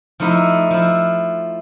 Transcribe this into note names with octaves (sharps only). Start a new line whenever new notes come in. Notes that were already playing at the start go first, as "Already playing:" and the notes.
F3 A3 D#4 E4
F3 E4